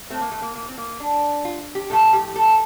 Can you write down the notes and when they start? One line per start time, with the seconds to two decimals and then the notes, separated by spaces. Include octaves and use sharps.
0.10 A2 A3 C4
0.21 A#3
0.32 A3
0.42 A#3
0.56 A#3
0.69 C4
0.78 A#3
1.00 D4
1.45 F4
1.75 G4
1.90 A2 F3 A3 A4
2.13 G4
2.36 A4